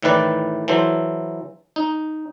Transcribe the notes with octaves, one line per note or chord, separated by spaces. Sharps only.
A2 D#3 E3 B4 D5
E3 F#3 A4 C5
D#4